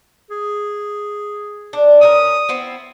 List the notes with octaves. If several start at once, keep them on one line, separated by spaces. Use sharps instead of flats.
G#4
D4
C#4 D4 A#4 D#6
B3 C4 E4